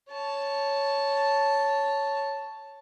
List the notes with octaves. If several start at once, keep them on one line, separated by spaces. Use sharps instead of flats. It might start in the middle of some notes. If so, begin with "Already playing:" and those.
C#5 A5